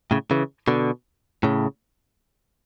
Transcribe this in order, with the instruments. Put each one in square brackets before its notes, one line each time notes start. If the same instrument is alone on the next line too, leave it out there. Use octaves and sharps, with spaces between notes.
[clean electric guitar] A2 C#3
C#3 E3
B2 D3
A2 C#3